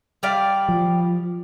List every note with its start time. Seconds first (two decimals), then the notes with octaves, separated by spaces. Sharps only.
0.23 G3 D5 F5
0.68 F3